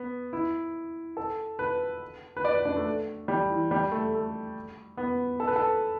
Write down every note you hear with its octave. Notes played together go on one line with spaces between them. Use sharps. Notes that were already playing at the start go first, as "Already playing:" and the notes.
Already playing: B3
E4
A4
B4
B4
D5
B4
D4
A3
G3
E3
G3
A3
A3
B3
A4
B4
A4